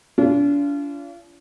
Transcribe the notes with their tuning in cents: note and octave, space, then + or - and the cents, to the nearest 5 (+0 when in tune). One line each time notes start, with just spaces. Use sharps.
D4 -40 F4 -30